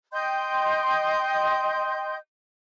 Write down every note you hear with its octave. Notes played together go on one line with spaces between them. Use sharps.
D#5 G5 C6 G6